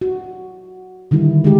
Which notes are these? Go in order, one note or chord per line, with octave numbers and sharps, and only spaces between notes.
F#4
D3 D#3 G3 E4
G#3 D#4 G4